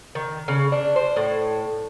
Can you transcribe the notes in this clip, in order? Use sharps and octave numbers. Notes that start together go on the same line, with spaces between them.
D#3
C#3
D4
C5
A2